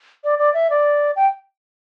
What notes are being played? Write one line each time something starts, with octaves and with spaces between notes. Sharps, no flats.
D5
D5
E5
D5
G5